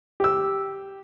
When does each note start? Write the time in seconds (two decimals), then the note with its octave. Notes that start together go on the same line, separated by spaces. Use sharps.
0.20 G4 E6